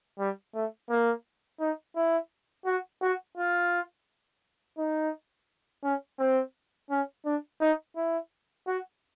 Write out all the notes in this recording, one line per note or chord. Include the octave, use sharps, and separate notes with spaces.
G3
A3
A#3
D#4
E4
F#4
F#4
F4
D#4
C#4
C4
C#4
D4
D#4
E4
F#4